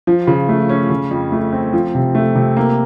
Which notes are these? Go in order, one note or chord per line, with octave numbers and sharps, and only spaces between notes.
F3
C#3
A3
C#4
C#3
F2
A3
C4
F3
C3
A3
C3
A#3